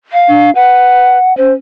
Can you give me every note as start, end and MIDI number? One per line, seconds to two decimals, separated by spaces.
0.12 0.50 77
0.29 0.54 62
0.55 1.18 71
0.55 1.36 78
1.37 1.52 61
1.37 1.53 72